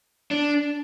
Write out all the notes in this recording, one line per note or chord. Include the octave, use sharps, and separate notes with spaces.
D4